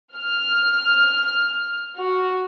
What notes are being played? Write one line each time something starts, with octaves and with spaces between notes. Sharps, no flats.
F6
F#4